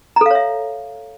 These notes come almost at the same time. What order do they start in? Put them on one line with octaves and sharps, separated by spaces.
A#5 A4 F5 C#5 E5